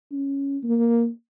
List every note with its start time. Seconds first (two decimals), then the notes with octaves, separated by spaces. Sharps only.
0.12 C#4
0.63 A#3